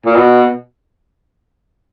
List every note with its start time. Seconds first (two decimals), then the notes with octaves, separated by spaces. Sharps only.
0.06 A#2
0.16 B2